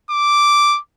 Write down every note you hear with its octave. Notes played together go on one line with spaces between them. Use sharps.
D6